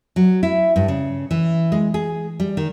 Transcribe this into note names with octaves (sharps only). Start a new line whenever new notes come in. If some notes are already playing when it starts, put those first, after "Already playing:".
F#3
E4
G2
C#3
E3
G#3
G#4
G3
D#3